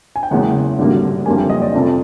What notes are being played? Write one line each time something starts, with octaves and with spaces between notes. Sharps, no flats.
G#5
G5
F#1 E2 C#3 E3 G#3 F#5
G#1 F#2 D3 G3 A#3
F#1 F2 D3 G3 A#3 G#5
G5
D#5
D5
F2 C3 F3 A3